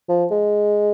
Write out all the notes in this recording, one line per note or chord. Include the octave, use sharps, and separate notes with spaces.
F3
G#3